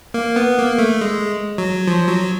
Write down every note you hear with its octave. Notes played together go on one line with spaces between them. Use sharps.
A#3
B3
A#3
A3
G#3
F#3
F3
F#3